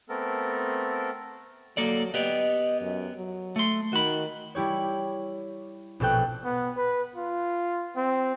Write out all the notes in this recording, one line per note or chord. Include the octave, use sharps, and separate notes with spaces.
A3 B3 C4 A4 A#4
F#3 A#3 A4 D5
B3 G4 D5 D#5
F#2
F#3
A3 C6
D#3 F#4 B5
G3 E4 G4 C#5
A#1 B2 A4 G5 F#6
B3
B4
F4
C4